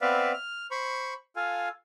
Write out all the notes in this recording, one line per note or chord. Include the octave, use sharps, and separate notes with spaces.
B3 C4 B4 D5 E5 F5
F6
C5 B5 C#6
F4 A4 F5 G#5